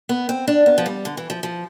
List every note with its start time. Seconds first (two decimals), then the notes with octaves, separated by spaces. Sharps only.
0.09 B3
0.29 C4
0.47 D4
0.66 B3
0.78 F3
0.86 G3
1.05 D3
1.17 E3
1.30 F3
1.43 F3